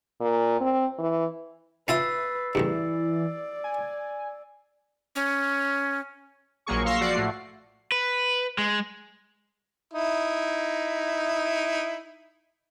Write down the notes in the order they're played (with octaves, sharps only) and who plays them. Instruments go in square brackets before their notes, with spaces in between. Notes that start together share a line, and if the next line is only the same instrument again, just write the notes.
[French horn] A#2
C4
E3
[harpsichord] C#4 E4 F4 [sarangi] B4 [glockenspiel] E6 A6 C7
[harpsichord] A1 E2 G2 [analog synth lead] E3 [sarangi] D5
[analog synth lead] G#5
[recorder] C#4
[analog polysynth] A#1 F#3 A#3 G#4 C#6
F5 C6 C#6 E6 A#6 C7
F3 F#4 D5 F#5 C7
A2 A3
[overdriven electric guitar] B4
G#3
[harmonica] D#4 E4